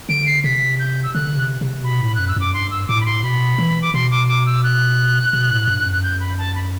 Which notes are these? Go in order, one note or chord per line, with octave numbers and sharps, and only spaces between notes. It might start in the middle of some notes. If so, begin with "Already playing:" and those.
D3 D7
C7
C3 B6
G6
E6
D3 F#6
C3
C3
B2 B5
A2
F#2 F#6
E6
F#2 D6
G2 C6
E6
A2 D6
B5
C6
B2 B5
E3
D6
B2 C6
D6
D6
E6
F#6
B2
A2
G2
F#2
F#6
G6
B5
A5
B5